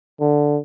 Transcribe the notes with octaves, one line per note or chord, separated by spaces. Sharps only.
D3